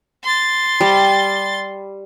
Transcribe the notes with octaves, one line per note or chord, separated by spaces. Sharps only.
C6 A6
G3